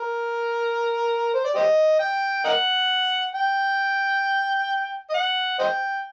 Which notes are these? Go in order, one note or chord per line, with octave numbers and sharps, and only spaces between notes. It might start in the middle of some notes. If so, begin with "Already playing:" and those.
Already playing: A#4
C5
D5
G4 C5 D#5
G5
A#4 D#5 F#5
G5
D#5
F#5
C5 D#5 G5